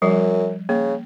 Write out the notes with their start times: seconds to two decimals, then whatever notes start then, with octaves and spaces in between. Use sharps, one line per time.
0.02 F#2 F3 G3
0.69 C#3 A#3